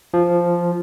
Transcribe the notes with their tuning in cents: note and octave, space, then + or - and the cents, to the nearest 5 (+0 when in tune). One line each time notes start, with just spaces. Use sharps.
F3 -5